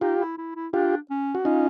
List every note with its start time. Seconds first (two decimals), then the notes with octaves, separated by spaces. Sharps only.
0.01 D#4 F4 G4
0.20 E4
0.38 E4
0.55 E4
0.73 D4 F4 G4
1.10 C#4
1.35 F#4
1.45 C#4 D#4 F4